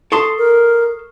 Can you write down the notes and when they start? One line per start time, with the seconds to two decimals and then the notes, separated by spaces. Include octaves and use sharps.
0.12 A4 A5 C6 C#6 D#6 C7
0.38 A#4